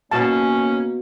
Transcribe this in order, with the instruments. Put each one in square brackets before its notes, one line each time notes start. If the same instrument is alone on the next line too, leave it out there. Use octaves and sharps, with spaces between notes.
[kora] B2 F5 [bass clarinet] A#3 [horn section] C#4 [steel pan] A5